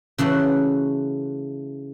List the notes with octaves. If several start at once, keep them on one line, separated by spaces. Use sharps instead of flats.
C#3 E3 A3 F#4